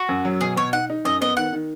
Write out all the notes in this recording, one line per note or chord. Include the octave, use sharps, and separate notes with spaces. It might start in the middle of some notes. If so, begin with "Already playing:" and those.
Already playing: F#4
F#2
F#3
B2 G#4
B2 C#5
D#4 F#5
D#4
F#2 D#5
B3 D#5
D#3 F#5
D#3